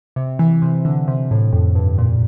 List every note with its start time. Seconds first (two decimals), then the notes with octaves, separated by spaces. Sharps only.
0.16 C3
0.39 E3
0.62 C3
0.85 D3
1.08 C3
1.31 A2
1.53 F2
1.75 G2
1.98 A#2